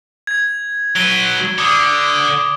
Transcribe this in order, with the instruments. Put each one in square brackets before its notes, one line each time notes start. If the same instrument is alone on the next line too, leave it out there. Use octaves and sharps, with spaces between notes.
[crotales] G#6
[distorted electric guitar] F#3 B4 [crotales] D7 G7
[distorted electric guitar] D3 [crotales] D6 D#6